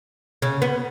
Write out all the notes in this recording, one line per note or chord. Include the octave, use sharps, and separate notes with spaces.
C#3
B3